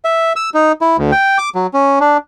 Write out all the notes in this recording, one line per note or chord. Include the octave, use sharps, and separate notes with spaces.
E5
E6
D#4
E4
D2
G5
D6
F#3
C#4
D4